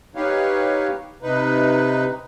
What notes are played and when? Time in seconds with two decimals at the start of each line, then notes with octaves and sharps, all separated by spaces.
0.15 D#4 G4 B4 C#5 F5
1.22 C3 D#4 B4